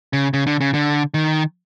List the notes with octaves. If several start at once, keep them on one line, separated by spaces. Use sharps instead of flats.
C#3
C#3
D3
C#3
D3
D#3